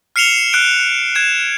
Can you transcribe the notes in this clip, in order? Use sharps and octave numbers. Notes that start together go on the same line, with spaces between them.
F6 C7 C#7 E7 F7 G7
F6 F#6 D7
F#6 G#6 E7